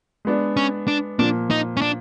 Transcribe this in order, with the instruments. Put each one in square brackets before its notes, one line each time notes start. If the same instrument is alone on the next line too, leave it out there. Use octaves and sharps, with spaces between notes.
[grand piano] G#3 B3 D4
[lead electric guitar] C#4
D4
[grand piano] A#2 F3 A#3 [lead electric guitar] D4
[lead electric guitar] D#4
C#4
D4